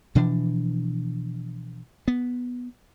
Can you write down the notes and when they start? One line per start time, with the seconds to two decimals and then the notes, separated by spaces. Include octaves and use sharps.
0.15 B2 E3 F3 D4
2.08 B3